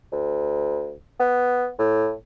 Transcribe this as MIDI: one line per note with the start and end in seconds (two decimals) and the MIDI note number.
0.12 0.95 38
1.20 1.67 59
1.79 2.13 45